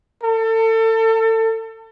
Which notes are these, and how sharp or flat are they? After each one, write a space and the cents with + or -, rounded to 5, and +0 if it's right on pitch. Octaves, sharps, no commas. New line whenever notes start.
A4 +30